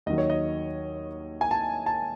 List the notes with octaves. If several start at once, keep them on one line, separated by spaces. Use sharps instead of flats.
D#2 D#3 F#3 D#5
C#5
D#5
G#5
A5
A5